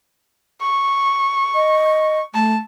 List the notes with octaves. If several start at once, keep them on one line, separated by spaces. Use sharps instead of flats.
C#6
D#5
A3 A5